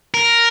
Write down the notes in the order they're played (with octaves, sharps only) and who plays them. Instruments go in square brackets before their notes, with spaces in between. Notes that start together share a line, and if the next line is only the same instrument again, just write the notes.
[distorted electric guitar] A#4